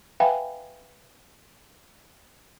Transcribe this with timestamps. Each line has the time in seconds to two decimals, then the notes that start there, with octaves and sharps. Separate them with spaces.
0.20 B4 E5 F5 G5 G#5 B5